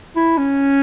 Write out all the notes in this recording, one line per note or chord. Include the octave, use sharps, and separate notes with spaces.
E4
C#4